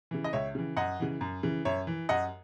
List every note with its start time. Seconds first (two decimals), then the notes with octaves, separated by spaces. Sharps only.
0.11 C#3 E3
0.24 D#5
0.33 C#2 C#5 E5
0.55 C#3 E3
0.77 F#2 D#5 F#5
1.00 C#3 E3
1.21 F#2
1.43 C#3 E3
1.65 F#2 C#5 E5
1.87 E3
2.09 F#2 D#5 F#5